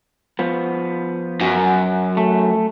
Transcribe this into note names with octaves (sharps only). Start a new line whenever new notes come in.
F3 B3
F#2
A3